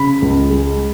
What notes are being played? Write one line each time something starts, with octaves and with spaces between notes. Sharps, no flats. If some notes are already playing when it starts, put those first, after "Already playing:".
Already playing: C#3 B5
C#2
G#3